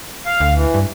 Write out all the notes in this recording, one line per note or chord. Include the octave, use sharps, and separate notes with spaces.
F5
D2
E3
G2